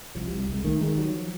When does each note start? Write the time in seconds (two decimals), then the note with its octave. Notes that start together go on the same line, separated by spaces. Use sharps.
0.15 C2 F3
0.27 C2 G3
0.40 G3
0.48 C2 G#3
0.64 D#3 A3
0.81 D#3 G#3
0.98 F#3 G3
1.15 F3